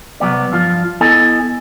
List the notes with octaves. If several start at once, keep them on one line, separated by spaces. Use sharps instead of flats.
C2 F#3 B3 D5
G2 F3 F4
B3 E4 A4 D#5 G#5